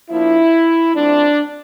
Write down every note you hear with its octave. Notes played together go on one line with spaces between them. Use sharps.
F3 A#3 D4 E4
F3 A3 C4 D4